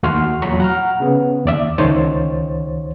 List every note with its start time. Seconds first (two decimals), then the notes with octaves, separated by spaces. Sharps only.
0.03 D#2 A3 F#4 C6 C#6 F6
0.42 E2 A#2 F#3 A#5 B5 C#6
0.60 F#5 A#5 F6
1.00 C#3 B3
1.46 D#2 D5 E5
1.78 C#2 D#3 C5 C#5 A6